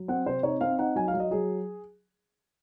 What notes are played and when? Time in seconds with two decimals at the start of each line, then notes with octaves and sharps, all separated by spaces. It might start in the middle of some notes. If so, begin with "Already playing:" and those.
Already playing: F#3
0.08 C4 F#5
0.26 C3 C5
0.43 D#4 C#5
0.61 C4 F5
0.78 D#4 F#5
0.96 F#3 G#5
1.08 F5
1.14 F#3
1.20 D#5
1.31 F#3 G#4